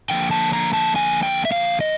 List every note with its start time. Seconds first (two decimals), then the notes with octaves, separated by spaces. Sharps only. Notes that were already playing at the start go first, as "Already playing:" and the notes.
0.10 D3 F3 A#3 G5
0.31 A5
0.53 A#5
0.73 A5
0.96 G#5
1.23 G5
1.45 E5
1.52 F5
1.81 D#5